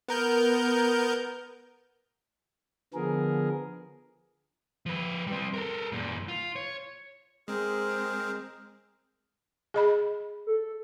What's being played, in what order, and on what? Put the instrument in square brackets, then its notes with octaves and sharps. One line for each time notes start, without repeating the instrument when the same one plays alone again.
[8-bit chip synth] B3 A#4 G6
[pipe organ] D3 F3 B3 G#4 A#4
[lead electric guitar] F3 B4
G3 C4
A4 A#4
F#2 A#2
F4
C#5
[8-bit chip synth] G#3 C4 [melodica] G#4 A#4 C5
[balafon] G#4 D#5 B5
[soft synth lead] A4